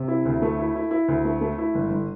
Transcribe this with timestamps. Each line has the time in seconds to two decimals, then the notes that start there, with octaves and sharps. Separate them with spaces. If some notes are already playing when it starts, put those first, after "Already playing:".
Already playing: C3
0.08 E4
0.25 D2
0.42 A3
0.59 E4
0.75 E4
0.91 E4
1.08 D2
1.25 A3
1.41 A3
1.58 E4
1.75 G1
1.91 G1